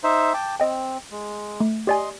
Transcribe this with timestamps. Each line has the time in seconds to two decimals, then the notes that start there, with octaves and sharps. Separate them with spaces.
0.04 D#4 C5 E5
0.34 G5 A5 D6
0.60 C4 D#5 G5
1.11 G#3
1.60 A3
1.87 G4 D5 D#5 G#5 C6